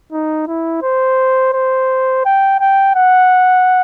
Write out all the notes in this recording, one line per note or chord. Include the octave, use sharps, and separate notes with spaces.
D#4
E4
C5
C5
G5
G5
F#5